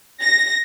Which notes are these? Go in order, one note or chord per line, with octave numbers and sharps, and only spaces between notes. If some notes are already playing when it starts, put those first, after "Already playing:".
A#6